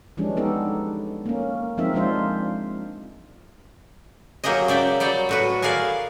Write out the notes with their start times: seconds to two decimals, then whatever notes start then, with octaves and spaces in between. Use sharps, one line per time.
0.17 E3 F3 G3 G#3 C#4 D4
0.37 B3 D#4 G4 A4
1.26 A#3 C#4
1.78 F3 G#3 C4 D#4 A#4 E5
1.94 F3 G#3 D4 F4 C5
4.44 F#3 A#3 G4 G#4 D#5
4.68 C#3 D5 E5 G5
5.00 F#3 G3 D5 G5
5.29 A2 F#4 B4
5.62 G#4 A#4 D5 F5 G#5